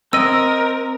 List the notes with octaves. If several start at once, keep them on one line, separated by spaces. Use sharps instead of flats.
C4 A#4 D#5 E6